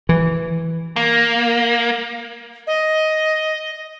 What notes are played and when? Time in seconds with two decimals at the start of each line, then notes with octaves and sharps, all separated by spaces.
0.09 E3
0.96 A#3
2.67 D#5